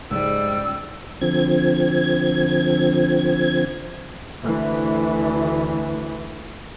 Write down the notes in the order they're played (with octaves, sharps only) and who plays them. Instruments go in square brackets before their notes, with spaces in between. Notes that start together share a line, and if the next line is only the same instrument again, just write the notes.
[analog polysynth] C#2 [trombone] G#2 [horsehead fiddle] G3 [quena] E6
[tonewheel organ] D3 F3 C4 G#6
[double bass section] D2 E3